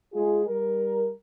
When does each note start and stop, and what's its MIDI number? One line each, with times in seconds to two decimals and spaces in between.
0.13 0.45 56
0.13 0.45 65
0.13 0.45 68
0.47 1.12 55
0.47 1.12 70